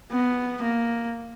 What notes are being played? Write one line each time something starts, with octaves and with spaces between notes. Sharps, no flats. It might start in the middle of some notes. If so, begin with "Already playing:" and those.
B3
A#3